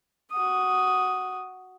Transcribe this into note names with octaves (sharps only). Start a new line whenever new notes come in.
F#4 D#6